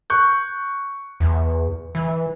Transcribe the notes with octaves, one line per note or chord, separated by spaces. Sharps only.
C#6 F#6 G6
E2
E3